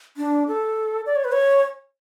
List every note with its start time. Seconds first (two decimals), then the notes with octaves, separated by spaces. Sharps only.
0.17 D4
0.48 A4
1.06 D5
1.16 C#5
1.24 B4
1.32 C#5